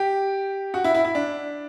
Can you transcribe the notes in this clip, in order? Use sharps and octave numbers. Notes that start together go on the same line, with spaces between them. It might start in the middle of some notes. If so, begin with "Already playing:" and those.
Already playing: G4
F#4
E4
E4
E4
D4